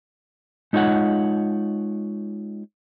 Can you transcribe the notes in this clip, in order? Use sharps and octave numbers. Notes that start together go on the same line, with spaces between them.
G#3 D#4 F4 C#5 F#5